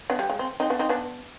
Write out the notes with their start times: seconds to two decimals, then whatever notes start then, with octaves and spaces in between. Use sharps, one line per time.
0.10 B3 D4
0.19 G3
0.30 G#3
0.39 C4
0.60 C4 D#4
0.70 B3 D4
0.79 C4 D#4
0.89 B3 D4